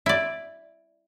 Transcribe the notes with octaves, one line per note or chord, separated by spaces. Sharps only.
E4 D5